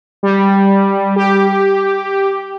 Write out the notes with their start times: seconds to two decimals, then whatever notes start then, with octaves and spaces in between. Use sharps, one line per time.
0.23 G3
1.16 G4